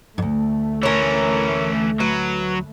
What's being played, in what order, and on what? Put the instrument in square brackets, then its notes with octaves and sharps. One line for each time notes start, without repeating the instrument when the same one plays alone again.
[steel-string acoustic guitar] D2 G#2 [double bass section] A3
[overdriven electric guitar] E3 C#4 [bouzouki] A#4 C#5
[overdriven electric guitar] F#3 [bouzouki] B4